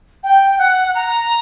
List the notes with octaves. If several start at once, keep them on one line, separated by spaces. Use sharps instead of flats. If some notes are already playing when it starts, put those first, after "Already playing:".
G5
F#5
A#5